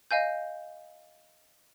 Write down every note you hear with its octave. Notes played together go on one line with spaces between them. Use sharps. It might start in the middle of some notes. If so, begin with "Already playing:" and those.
D#5 F5 G#5 G6